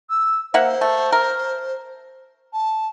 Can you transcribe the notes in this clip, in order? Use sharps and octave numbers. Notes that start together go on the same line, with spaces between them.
E6
A#3 C5 E5 F#5
A3
A#4
A5